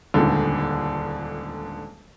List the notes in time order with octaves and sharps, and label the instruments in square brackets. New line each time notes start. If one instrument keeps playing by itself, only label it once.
[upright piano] D#1 C#2 D3